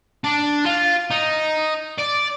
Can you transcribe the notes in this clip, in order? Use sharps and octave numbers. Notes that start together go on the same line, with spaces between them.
D4
F4
D#4
D5